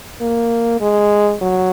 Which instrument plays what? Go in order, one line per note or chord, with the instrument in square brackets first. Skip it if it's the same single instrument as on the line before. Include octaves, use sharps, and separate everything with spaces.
[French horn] A#3
G#3
F#3